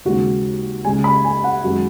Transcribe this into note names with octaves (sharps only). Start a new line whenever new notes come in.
D#2 C#3 G#3 F#4
C#2 C#3 G#3 G#5
B5
G#5
F#5
F#2 D#3 G#3 F#4